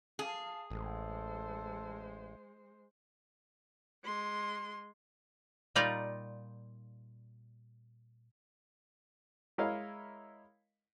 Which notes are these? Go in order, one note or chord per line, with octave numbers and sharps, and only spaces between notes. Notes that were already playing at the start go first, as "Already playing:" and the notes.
G#4 F5 A5
A1 G#3 A4 C5
G#3 C6
A#2 G3 D#4 F4 D5 A#5
G#3 E4 A#4 C#5 D#5 F5